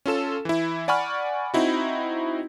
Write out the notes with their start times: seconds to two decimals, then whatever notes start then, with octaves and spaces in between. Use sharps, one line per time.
0.06 C#4 F4 A4 E7
0.45 E3 E4
0.88 D5 F#5 G#5 B5 C#6 F6
1.54 C4 D#4 E4 F#4